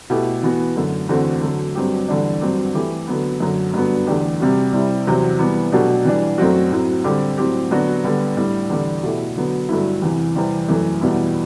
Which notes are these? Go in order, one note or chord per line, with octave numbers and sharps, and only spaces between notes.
B2 A3 E4 G4
E3 B3 F#4
F#2 D3 A3
E2 D3 A3 C4 F#4
D3 F#3 A3
G2 F#3 C4 G4
E2 D3 G3 D4
G2 F#3 C4 G4
E3 A3 E4 G4
D3 F#3 B3
F#2 D3 F#3
G2 D3 F#3 B3
E2 D3 A3 D4 G4
C3 G3 C4 F#4
C3 G3 C4 E4
E2 C3 F#3 C4
E3 G3 B3
B2 F#3 A3 D4 G4
E3 G3 D4
F#2 F#3 A3 C4 F#4
A2 F#3 C4
D3 G3 C4 G4
A2 F#3 C4 G4
D3 F#3 B3 D4 F#4
D3 G3 B3
A2 G3 D4
E2 D3 G3
B2 A3 E4 G4
D3 F#3 B3
G2 D3 F#3 A3 E4
E2 C3 E3
E2 C3 E3 G3 C4
F#2 E3 A3
E2 B2 G3 B3 E4